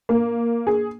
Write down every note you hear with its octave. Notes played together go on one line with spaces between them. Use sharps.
A#3
G#4